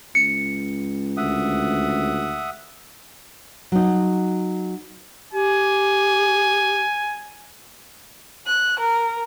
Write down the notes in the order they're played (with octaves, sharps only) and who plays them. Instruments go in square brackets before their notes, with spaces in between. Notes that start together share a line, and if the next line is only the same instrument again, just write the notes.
[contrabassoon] C#2 [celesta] C#7
[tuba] D2 [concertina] E5 F#5 D#6
[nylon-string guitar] F#3 D#4
[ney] G4 [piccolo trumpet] G#5
[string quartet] F#6
A#4